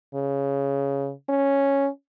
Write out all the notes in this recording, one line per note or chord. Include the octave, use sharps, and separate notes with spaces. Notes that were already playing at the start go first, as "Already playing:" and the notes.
C#3
C#4